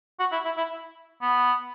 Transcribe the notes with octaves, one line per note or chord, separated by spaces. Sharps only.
F#4
E4
E4
E4
B3